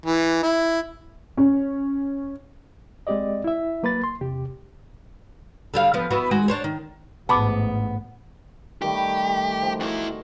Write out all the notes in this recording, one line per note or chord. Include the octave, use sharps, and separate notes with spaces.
E3
E4
C#4
G#3 C4 G4 D5 D#5
E4 E5
F#3 A#3 B4 B5 A6
C6
E2 C3 G4
D3 G3 F5
F3 B3
B3 E4 F#4
D#3 G#3 F#4
D4 C5 C#5
D#3
A1 G#2 B3 A5 B5 D6
D#3 G3 A3 G4
B5
F3 D#4
E2 E4 F#4 A#4